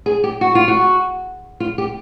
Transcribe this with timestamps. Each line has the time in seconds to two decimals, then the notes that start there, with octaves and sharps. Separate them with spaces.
0.06 G#4
0.24 G4
0.41 F#4
0.55 F4
0.68 F#4
1.60 F4
1.78 G4